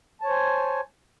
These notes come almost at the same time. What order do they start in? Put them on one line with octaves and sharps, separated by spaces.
A5 C#5 C5 G#5